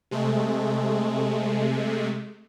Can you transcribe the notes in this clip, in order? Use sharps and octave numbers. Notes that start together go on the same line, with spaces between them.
C3 G#3 A3